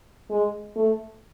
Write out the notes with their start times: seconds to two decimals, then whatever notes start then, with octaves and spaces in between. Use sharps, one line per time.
0.30 G#3
0.76 A3